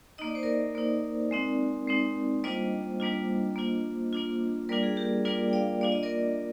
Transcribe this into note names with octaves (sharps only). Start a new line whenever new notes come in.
A#3 D#4 D#5
D5
C5
A#4 D5
A#3 D#4
G#3 C4 D#4
G#3 C4 D#4
G3 A#3 D4 F4 C5 D#5
G3 A#3 D4 F4
A#3 D4 F4
A#3 D4 F4
G3 A#3 D4 F4 A#4 D5
G#4
G4 A#4
G3 A#3 D4 F4 A#4 D5
G5
D5 F5
A#3 D4 F4 D5
D#5
A#4 D5